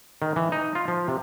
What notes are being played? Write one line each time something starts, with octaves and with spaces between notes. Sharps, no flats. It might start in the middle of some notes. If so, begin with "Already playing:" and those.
D#3
E3
D#4
F4
F3
C3